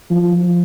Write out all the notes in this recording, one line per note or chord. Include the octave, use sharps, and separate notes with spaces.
F3